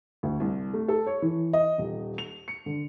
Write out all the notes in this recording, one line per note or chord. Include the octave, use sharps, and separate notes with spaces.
D2
C2
A3
A4
C#5
E3
D#5
D#1
F7
C#7
D3